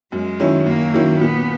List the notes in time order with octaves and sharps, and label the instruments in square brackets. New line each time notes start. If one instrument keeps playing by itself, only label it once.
[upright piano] F#2 [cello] G#3
[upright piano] D#3 F#3 C#4 E4
[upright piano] F#2 [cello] A#3
[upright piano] D#3 F#3 C#4 E4
[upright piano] A#2 [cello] B3